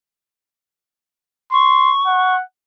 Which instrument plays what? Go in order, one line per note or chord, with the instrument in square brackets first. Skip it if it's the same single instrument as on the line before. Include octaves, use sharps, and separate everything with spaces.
[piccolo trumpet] C6 [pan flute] C#6
[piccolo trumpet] F#5